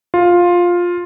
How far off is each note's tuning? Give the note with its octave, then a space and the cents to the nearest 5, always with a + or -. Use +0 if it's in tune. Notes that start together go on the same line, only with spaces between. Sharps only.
F4 +10